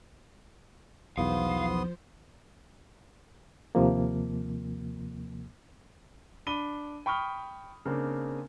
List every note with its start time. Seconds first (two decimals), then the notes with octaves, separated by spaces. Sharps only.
1.17 B1 E2 F3 B3 C5 F5 C6 D#6
3.75 D#2 C3 F3 A#3
6.47 D4 B5 D#7 G7
7.06 G5 B5 C#6 D#6 F6 G7
7.85 C#3 A#3 C4 D4